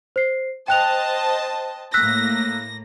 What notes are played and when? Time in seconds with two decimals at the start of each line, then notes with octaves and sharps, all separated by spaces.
0.16 C5 C7
0.68 C5 D#5 G5 A5 F#6 F7
1.94 A2 A#3 E6 F#6 A#6 B6